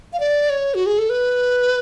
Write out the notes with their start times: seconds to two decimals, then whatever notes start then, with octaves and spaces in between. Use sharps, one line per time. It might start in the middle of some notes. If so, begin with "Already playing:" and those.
0.13 F5
0.20 D5
0.50 C#5
0.74 F#4
0.86 G#4
0.99 A4
1.10 B4